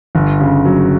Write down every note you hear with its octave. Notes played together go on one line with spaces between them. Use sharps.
G1
C#3
F#3